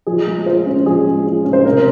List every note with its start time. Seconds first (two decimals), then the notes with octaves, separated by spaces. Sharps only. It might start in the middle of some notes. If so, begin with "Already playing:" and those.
0.06 F3 G#4
0.27 G#3
0.46 F4 C5
0.66 C#4
0.85 F3 G#4
1.06 G#3
1.26 F4
1.45 C#4
1.53 C5
1.65 C3 A#4